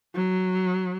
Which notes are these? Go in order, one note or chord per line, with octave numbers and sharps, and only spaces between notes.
F#3